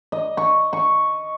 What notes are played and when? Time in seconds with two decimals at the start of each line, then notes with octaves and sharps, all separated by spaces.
0.12 D#5
0.37 C#6
0.73 C#6